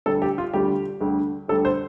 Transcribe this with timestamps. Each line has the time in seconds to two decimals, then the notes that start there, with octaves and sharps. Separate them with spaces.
0.06 D2 D3 G3 A4
0.22 G4
0.38 F4
0.54 D2 D3 G3 G4
1.01 D2 D3 G3
1.48 D2 D3 G3 A4
1.65 C5